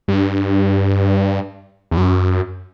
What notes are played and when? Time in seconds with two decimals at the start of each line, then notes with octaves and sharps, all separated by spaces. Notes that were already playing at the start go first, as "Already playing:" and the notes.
0.08 G2
1.91 E2
1.97 F#2